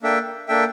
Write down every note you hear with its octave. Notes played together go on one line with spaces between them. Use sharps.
A#3 D4 A4 E5 G5
A#3 D4 A4 E5 G5